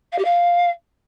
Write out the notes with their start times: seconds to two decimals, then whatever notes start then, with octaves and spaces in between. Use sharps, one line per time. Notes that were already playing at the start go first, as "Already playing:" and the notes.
0.12 F5
0.18 G4
0.24 F5